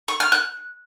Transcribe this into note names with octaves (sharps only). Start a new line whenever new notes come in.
C#6
F6
F#6